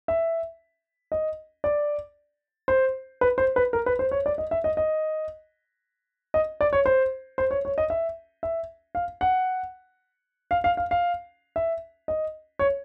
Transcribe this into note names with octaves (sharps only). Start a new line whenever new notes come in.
E5
D#5
D5
C5
B4
C5
B4
A#4
B4
C5
C#5
D5
D#5
E5
D#5
D#5
D#5
D5
C#5
C5
C5
C#5
C#5
D#5
E5
E5
F5
F#5
F5
F5
F5
F5
E5
D#5
C#5